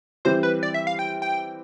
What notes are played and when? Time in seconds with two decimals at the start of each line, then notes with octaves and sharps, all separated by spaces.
0.25 E3 G3 C4 C5
0.43 B4
0.63 D5
0.74 E5
0.87 F5
0.99 G5
1.22 G5